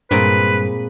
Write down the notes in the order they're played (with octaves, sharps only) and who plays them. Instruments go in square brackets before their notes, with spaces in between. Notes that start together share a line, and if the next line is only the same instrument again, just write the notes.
[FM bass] G2 [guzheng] A#2 G#3 C4 [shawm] B4